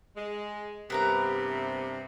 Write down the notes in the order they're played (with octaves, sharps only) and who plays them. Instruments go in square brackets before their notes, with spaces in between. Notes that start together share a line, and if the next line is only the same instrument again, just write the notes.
[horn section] G#3
[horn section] G2 C3 [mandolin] B3 A#4 A#5